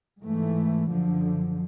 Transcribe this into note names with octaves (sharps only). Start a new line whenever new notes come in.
G#2 E3 A3
F#2 D3 F3